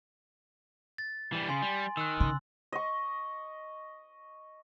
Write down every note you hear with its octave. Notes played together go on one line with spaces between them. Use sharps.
A6
E3 G3
C#3 G#5 C6
G3
D#3 E6 F#6
C#3 C6
D#5 C#6